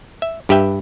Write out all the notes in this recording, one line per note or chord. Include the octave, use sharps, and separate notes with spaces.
E5
G2 G4 B4 E5 G5